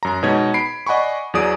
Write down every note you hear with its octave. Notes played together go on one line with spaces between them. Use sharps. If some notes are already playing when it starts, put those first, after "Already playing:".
F#2 A#5
B2 G#3 D#4 C#5 D#5 G#6
B5 C7 D7
D5 D#5 F#5 G#5 B5 C#6
E2 F#3 G#4 D5 D#6 D7